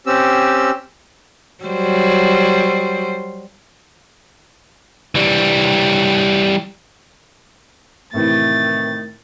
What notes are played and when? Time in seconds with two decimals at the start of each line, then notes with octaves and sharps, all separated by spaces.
0.07 C4 C#4 G4 E6
1.64 F#3 G3 C5
5.15 E3 G3
8.14 A2 C3 D#3 E3 A3 A6